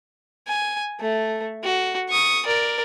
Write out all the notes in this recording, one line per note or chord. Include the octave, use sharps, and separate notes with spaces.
G#5
A3
F#4
C#6 D#6
A#4 D5